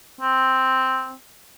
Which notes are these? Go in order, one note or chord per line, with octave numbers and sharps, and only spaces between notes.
C4